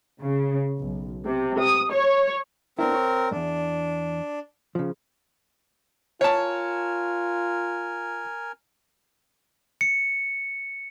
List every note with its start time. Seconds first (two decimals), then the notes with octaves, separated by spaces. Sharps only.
0.20 C#3
0.79 B1
1.26 C3
1.59 D#6
1.92 C#5
2.79 B3 C4 D4 E4 A#4
2.94 C#5
3.31 E2 G2 D4
4.75 C#3 F3
6.21 F4 A#4 C#5 G#5 A5
9.81 C#7